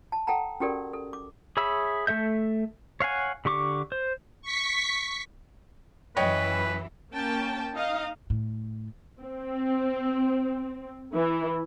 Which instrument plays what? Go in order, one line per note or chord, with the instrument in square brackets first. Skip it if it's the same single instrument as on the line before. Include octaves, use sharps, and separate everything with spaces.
[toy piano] A5
A4 F#5 G5 A5 A#5
C#4 F#4 G4 A4 A#4 D5
A4
D6
[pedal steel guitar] G#4 C#5 E5 B5 E6
A3 A4 E5 G6
C#5 F5 F#5 G#5
D3 G4 C#6 D6
C5
[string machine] C#6 B6
[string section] F#2 E3 [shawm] B4 [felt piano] C#5 D#5 G5
[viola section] A#3 C#4 G5 A5
D#4 D#5 F5
[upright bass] A2
[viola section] C4
E3